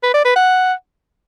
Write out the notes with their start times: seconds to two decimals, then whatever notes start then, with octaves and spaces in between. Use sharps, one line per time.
0.03 B4
0.14 D5
0.25 B4
0.36 F#5